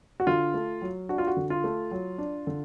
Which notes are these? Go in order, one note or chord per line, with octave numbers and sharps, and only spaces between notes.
F#4
D3 F4
A3
F#3
D4 F#4
F4
F#4
D3
F4
A3
F#3
D4
D3